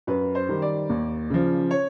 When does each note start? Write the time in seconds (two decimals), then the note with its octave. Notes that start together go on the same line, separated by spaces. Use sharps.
0.07 F#2 B4
0.35 C5
0.49 D#3 G3
0.62 D5
0.90 D#2
1.30 C#3 F3
1.71 C#5